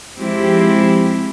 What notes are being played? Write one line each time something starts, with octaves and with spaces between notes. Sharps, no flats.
F3 G#3 C4 E4 G4